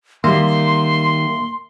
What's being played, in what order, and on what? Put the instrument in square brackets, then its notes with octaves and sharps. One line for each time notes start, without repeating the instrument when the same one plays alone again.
[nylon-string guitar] D#3 G3 [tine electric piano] A#3 E5 [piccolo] C6